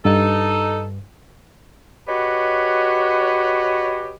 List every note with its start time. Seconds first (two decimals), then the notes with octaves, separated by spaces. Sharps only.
0.05 G2 D#4 A4
2.08 F#4 G4 B4 C#5 D#5